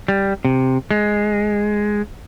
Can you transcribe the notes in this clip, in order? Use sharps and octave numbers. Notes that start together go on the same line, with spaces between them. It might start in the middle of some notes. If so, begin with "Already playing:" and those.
G3
C3
G#3